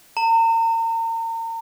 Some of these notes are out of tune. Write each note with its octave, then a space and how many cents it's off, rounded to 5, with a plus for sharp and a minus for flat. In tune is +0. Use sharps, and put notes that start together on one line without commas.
A#5 -40